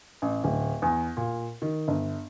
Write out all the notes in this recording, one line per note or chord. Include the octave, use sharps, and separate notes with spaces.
A1
D1
E2
A#2
D#3
G1